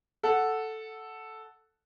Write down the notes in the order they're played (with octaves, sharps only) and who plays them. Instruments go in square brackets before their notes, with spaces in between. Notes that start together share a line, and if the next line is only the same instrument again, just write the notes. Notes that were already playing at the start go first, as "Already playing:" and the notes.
[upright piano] A4 F#5